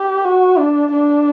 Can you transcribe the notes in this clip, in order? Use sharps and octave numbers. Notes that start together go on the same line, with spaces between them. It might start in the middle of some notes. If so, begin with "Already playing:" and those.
Already playing: G4
F#4
D4
D4